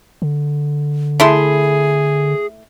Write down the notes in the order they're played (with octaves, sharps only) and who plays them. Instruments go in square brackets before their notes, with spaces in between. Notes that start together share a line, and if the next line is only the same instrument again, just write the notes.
[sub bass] D3
[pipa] A3 E4 C6 [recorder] G#4